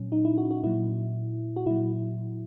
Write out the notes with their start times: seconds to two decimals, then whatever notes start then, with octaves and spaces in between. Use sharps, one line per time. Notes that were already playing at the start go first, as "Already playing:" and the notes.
Already playing: A#2 F#3 C#4
0.12 D#4
0.25 E4
0.38 F#4
0.51 F#4
0.64 A#2 F#3 E4
1.56 F#4
1.66 A#2 F#3 E4